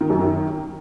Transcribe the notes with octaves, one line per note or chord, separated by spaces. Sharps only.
D#3
F#2
D#3